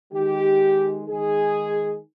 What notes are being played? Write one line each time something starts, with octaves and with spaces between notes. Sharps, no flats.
D#3 G#3 G4
D#3 G#3 G#4